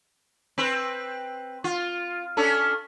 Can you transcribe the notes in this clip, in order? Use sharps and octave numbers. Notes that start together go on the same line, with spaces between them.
C4 B4
F4
C#4 D4 A4